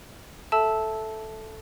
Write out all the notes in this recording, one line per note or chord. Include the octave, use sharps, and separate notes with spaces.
A4 E5 A5 E6